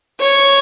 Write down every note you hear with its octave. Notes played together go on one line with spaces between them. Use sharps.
C#5